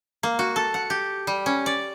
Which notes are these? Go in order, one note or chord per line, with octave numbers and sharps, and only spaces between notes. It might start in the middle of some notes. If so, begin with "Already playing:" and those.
A#3
F#4
A4
F#5
G4
G3
C#4
D5